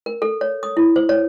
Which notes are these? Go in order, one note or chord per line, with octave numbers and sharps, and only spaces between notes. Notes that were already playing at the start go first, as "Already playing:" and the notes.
A#4
A4
C#5
D#6
E4
C5
C#5